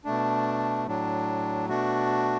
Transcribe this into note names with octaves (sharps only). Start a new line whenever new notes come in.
B2 A3 D4
A2 F#3 D4
B2 A3 D4 F#4